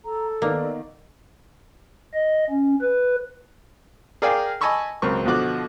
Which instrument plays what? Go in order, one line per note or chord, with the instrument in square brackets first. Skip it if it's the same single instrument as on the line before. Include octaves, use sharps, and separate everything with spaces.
[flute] A4 [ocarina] A#5
[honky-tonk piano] D#3 B3 [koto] A#3 [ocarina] D5
[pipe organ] D#5
C#4
B4
[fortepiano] G#4 A#4 D5 F5 G5 G#5
D#5 G#5 A5 B5 C#6 E6
C#2 F#3 C4 A#4 C#6
B2 D3 F3 F#4 D6 F#6